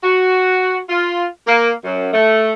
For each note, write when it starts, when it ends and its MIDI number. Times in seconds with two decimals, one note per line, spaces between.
0.03 0.78 66
0.88 1.25 65
1.47 1.71 58
1.84 2.09 42
2.13 2.53 57